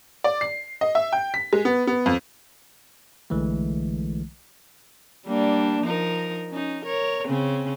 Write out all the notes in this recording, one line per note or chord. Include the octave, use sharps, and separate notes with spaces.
D5
C7
D#5
E5
G5
B6
G#3
B3
B3
F2
B1 D3 E3 G#3 A3
G3 A#3 D4
F3 D#4 A#4
C#4 D#4
A#4 C#5
C#3 C4 C#4